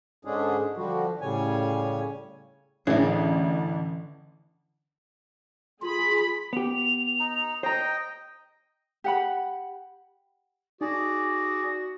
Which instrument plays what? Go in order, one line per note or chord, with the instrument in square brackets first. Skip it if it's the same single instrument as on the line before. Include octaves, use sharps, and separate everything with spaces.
[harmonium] G#2 D3 G#3 C#4 D4 G#4
D3 F3 G3 F#4
A2 C#3 G3 C#5 G#5
[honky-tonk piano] A1 [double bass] D3 E3 [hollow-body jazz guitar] D4 G#4 [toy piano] C#5 E5
[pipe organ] F4 [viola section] G#4 B5
[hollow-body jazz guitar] B3 G4 [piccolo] F7
[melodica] D#4
[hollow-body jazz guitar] C5 A#5 [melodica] D#5 G5
[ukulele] G4 F#5 B5
[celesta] D#4 [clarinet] F#4 [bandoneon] G#4 D5